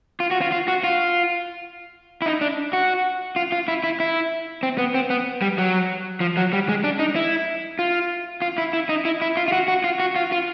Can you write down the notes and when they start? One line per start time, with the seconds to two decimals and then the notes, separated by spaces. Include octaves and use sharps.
0.20 F4
0.31 F#4
0.41 F4
0.52 F4
0.68 F#4
0.84 F4
2.22 E4
2.26 D#4
2.41 D4
2.73 F#4
3.36 F4
3.52 F4
3.68 E4
3.84 E4
4.00 E4
4.63 C4
4.78 B3
4.94 C4
5.10 B3
5.42 G3
5.58 F#3
6.20 F3
6.37 F#3
6.53 G3
6.69 G#3
6.84 D4
6.99 D#4
7.15 E4
7.79 F4
8.42 F4
8.58 E4
8.73 E4
8.89 D#4
9.05 E4
9.22 E4
9.37 F4
9.48 F4
9.52 F#4
9.68 F#4
9.84 F4
10.00 F#4
10.16 F4
10.32 F4